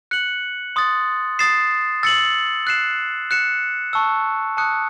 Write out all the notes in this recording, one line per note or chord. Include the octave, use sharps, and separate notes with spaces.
F#6 C#7 F#7
C6 D#6 A6
D#6 A6 C7 E7
E6 A6 C#7 F#7
F#6 C7 E7
F#6 C#7 E7
A5 C#6 E6
A5 D#6 F#6 C#7